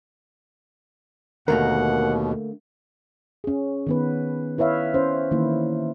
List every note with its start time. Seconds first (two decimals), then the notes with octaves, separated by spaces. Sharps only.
1.48 D#2 B2 D3 A3 A#3 A#4 F#5
3.44 C#4 G#4
3.87 D#3 B3 B4
4.58 E4 B4 C#5 E5 F5
4.94 C#4 C5
5.31 D#3 E3 A#3 E4